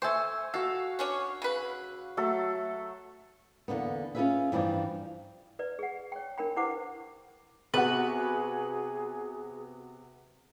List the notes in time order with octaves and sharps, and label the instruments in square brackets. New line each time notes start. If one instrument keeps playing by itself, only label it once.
[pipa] A4 C5 [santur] E5 G#5 C#6
[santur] F#4 F5 [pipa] A4
[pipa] C#4 D4 C#5
C#3 B4
[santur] F#3 A3 A4
[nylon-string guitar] E2 D3 A#3 B3
C#4 F4 F#4 G#4 B4 E5
G2 E3 F3 D4 D#4
[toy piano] B4 D5
G#4 F#5
C#5 G5
D4 A#4 G5 B5
E4 G4 B4 C5 F#5 D6
[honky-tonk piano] C3 B3 F#4 [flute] G#4 [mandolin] B4